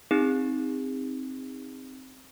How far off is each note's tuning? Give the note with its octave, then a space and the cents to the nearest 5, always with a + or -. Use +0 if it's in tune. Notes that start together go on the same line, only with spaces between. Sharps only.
C4 +0 D#4 +0 G#4 -45